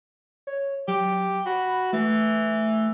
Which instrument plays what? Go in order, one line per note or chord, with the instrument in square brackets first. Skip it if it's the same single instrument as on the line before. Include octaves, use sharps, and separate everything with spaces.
[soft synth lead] C#5
[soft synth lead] F#3 [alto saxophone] G4
[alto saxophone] F#4 [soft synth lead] B5
[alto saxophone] E3 [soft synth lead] A3